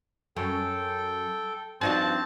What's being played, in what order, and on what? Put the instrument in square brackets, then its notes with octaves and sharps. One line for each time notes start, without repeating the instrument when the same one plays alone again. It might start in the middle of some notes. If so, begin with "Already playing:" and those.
[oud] F#2 [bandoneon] A4 G5
[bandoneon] G2 F3 [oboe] C4 [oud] D4 D#4 F#4 [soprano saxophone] A5